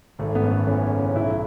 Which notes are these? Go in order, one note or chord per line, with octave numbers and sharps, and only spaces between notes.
G#1 A3
B3
F#2
A3
E3 C#4
C#4
C#3
C#4
B1 E4
E4